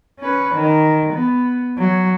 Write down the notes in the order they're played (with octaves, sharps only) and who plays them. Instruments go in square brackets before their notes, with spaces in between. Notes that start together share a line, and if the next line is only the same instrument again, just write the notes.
[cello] C#4 B4
D#3
B3
F#3